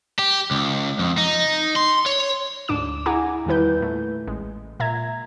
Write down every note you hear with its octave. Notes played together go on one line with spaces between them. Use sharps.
G4
C#2
F2
D#4
C6
C#5
D2 G#2 D4 D6 E7
E4 G#4 F#5 G#5 A#5 D6
E2 D#3 G3 E4 B4 G6
A#2 A3
A1 G#3
A#2 E5 A#5 G#6